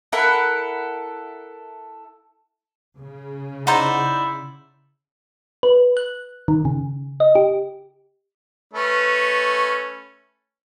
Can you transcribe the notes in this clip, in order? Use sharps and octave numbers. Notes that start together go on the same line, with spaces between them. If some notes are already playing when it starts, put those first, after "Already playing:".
E4 A4 A#4 F#5
C#3
D#4 E4 C5 D5 F#5 A#5 G6
B4
F#6
D#3
C#3
D#5
G4
A3 C#4 B4